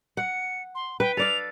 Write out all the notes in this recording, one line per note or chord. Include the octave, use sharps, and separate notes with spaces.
F#5 C#7
C6
B4 G5
A4 D5 F5 F7